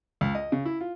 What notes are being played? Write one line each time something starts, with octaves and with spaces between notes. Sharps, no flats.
C#2
D#5
C#3
E4
F4